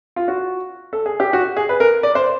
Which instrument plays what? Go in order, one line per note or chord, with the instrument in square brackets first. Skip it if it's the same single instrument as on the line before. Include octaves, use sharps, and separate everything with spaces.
[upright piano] F4
F#4
A4
G#4
G4
F#4
G#4
B4
A#4
D5
C5